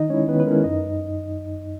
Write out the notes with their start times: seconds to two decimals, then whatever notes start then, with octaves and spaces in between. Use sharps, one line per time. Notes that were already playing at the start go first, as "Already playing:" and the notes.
Already playing: D#3 D#4 D#5
0.10 G#3 C#4 E4 C#5
0.28 D#3 B3 B4
0.40 B4
0.46 G#3 C#4 E4 A#4
0.64 F#2 D#4 D#5